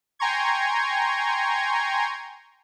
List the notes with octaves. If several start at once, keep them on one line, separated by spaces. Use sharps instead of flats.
G5 G#5 A#5 C6 C#6 G#6